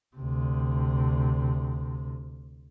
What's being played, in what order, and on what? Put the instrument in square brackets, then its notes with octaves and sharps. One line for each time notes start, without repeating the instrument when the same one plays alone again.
[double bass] D2 C3